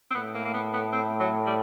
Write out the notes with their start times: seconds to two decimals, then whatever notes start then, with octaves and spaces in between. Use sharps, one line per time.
0.11 C4
0.14 A2 B3
0.34 A#3
0.45 A#3
0.53 B3
0.73 B3
0.92 C4
1.20 F#3
1.46 G3